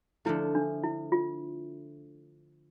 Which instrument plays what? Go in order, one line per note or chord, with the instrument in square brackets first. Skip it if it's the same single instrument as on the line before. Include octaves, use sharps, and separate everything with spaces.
[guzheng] D3 F3 A3 [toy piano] E4
[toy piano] D4
E4
F4